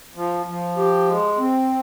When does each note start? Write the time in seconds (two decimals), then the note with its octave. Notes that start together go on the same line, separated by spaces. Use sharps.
0.15 F3
0.46 F3
0.77 G4
1.08 G#3
1.38 C4